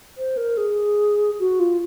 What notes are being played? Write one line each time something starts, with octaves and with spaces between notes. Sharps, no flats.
C5
A#4
G#4
F#4
F4